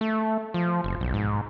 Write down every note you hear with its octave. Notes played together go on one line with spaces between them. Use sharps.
A3
F3
F#1
B1
G#2